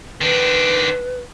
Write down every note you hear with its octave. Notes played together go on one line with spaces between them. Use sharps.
D#3 D4 B4